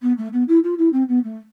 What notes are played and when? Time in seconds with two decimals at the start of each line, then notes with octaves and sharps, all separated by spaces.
0.02 B3
0.17 A3
0.33 B3
0.48 E4
0.63 F4
0.78 E4
0.93 C4
1.08 B3
1.24 A3